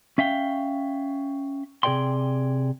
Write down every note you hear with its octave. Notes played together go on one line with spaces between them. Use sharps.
C#4 E5 F5 G5
C3 G#4 C#5 D5 G5 C6